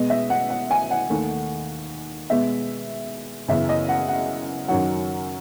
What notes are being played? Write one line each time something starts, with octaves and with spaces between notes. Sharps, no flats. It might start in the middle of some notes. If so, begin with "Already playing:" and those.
Already playing: B2 G#3 B3 D#5
E5
F#5
F#5
G#5
F#5
D#2 D#3 A3
B2 G#3 B3 E5
F#2 C#3 E3 B3 E5
D#5
F#5
F#5
F#2 D#3 F#3 F#5